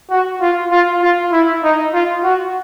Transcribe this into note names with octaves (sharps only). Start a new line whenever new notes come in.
F#4
F4
F4
F4
E4
D#4
F4
F#4